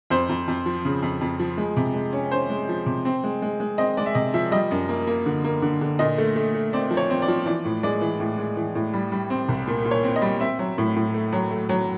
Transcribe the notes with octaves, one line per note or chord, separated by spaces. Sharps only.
F2 C5
F2
F2
F3
C#3
F2
F2
F3
G#3
C3
G#3
C#4
C#4 C5
G#3
F3
C3
C4
G#3
G#3
G#3
C4 D#5
G#3 D5
E5
C3 D#5
F3 E5
G3 D#5
F#2
A#3
A#3
D3
A#3
D3
D3
A#2 D#5
A3
A3
A3
C4 D5
F3
C#5
C4
D5
F3
E3 D5
A2
G#3 D5
E3
A2
G#3
E3
A2
G3
G3
C4
C2
A#2
A#2
C#5
C4
D#5
G3
C4 E5
F#3
A2
A2
A3
F#3
A3
F#3